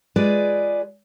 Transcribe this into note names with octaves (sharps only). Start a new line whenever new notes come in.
G#3 F4 G#4 B4 D5